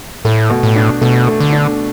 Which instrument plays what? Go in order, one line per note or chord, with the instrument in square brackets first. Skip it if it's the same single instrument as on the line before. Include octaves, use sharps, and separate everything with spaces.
[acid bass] A2 [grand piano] A3
[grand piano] B2
[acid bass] A2
[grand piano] D4
[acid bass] B2 [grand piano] A3
[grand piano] A3
[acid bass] D3
[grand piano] D4